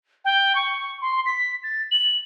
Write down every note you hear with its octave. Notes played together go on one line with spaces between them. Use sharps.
G5
C#6
C6
B6
A6
F#7